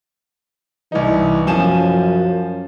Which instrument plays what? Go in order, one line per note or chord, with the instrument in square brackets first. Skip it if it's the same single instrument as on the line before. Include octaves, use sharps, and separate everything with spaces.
[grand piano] C2 D#4 [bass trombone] E3
[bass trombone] F#2 [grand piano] F3 G#5 E7